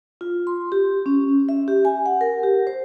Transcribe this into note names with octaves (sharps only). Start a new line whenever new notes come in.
F4
C6
G4
C#4
E5
G4
G#5
F#5
A#4
G4
C5